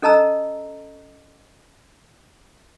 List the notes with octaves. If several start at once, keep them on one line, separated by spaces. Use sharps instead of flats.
C#4 A4 D#5 A5 A#5 E6